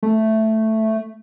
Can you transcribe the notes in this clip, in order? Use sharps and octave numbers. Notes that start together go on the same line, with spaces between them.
A3